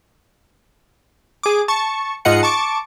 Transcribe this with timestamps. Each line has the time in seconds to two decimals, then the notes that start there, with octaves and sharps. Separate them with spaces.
1.43 G#4 D6
1.68 A5 C#6
2.25 G#2 F4 D#5 F#5 C#7
2.43 A5 C#6 D6